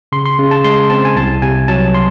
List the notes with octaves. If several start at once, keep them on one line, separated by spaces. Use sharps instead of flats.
C#3 C6
C6
C#3
A5
G#3 C6
C4 A5
G#5
C2 A5
C3 G#5
F#3 A5
C6